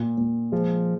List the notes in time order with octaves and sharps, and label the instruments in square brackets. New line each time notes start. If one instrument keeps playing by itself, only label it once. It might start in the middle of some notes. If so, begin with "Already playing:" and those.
Already playing: [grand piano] A#2
A#2
[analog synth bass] F3 [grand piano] G#3